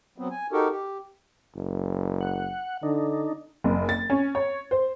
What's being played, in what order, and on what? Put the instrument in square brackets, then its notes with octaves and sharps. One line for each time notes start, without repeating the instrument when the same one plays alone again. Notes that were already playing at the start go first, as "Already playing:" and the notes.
[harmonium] F#3 B3 C4
G#5
D#4 F#4 G4 A4 A#4
G4
[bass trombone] F#1
[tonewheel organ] F#5
[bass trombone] D3 [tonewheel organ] D4 D#4
[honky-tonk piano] F#1
A6
C#4
C#5
C5